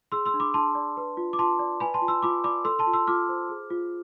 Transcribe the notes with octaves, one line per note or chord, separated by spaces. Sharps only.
G#4 C6 E6
C6 E6
D4
B5 D6
D4 A5 C6
D5
B4
F4
D6
F4 A5 C6
D5
B4 G#5 B5
A5 C6
F4
C6 E6
F4 B5 D6
D5 B5 D6
A4 C6 E6
A5 C6
F4
C6 E6
F4 D6 F6
C5
G#4
F4